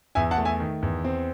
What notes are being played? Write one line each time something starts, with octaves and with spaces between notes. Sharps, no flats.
E2 E5 G#5
F#5 A5
A3
E5 G#5
D#3
E2
C4